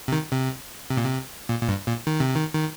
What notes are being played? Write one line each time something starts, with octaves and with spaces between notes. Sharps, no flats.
C3
D#3
C3
C3
A#2
C3
A#2
A#2
G2
A#2
D#3
C3
D#3
D#3